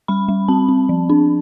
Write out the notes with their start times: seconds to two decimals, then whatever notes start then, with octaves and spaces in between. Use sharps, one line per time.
0.08 G3 B5
0.29 G3
0.48 C4 A5
0.69 C4
0.89 F3
1.10 D4